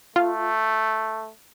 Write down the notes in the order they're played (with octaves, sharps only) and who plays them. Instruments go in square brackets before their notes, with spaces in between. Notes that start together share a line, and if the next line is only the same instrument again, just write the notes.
[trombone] A3 [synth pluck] F4